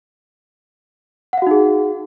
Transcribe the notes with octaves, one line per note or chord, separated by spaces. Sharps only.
D#4 F#4 G#4 F5 F#5